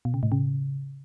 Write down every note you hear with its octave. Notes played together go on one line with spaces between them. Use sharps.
B2
C#3
A2
C#3